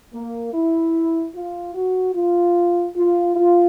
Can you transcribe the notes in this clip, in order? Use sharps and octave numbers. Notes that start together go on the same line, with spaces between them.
A#3
E4
F4
F#4
F4
F4
F4